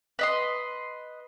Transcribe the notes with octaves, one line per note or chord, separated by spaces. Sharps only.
B4 D#5 C6